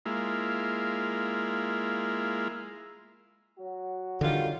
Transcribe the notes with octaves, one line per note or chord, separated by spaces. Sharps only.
G#3 A#3 E4 F4
F#3 F#4
D3 D#3 G3 F4